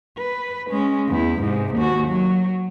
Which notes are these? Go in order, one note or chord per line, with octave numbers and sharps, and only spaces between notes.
B4
G#3 C#4
E2 E4
G#2 C3
D#2 F#4
F#3